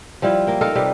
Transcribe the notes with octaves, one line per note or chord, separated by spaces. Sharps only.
F3 G3 E4 F4
A#3 G5
D#4 F4 A4 A#4
C3 G3 G4 B4